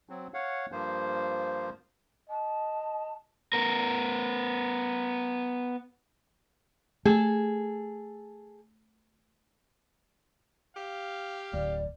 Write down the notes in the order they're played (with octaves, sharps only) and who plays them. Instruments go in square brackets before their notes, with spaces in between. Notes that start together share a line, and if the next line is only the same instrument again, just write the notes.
[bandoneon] F#3 C4
C#5 F5 F#5
G2 F3 A#3 C5
[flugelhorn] D#5 [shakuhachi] A5
[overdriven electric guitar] B3 A#4
[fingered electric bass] A3 [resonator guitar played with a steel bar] G#4 A4
[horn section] G4 F5
[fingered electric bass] D1 [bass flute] D5